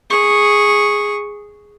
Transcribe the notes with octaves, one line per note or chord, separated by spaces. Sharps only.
G#4 C#6